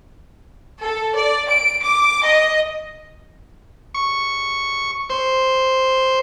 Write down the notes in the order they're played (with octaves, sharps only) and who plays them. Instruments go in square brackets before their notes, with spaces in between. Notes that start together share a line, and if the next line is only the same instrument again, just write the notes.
[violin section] A4
D5
D7
D6
D#5
[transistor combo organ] C#6
C5